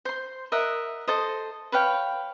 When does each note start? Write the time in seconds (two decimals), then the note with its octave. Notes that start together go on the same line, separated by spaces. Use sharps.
0.05 C5 C6
0.52 A#4 D#5 E5 F#5
1.08 A4 C5 D#5
1.72 B4 C#5 F5 G5